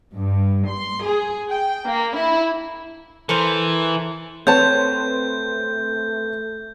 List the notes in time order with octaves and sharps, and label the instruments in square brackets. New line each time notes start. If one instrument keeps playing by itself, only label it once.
[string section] G2
C6
G#4
G5
A#3
E4
[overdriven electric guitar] E3 [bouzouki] A4 A#4 C5
[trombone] A3 [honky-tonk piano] C4 B4 [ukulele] C#5 A5 [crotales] G6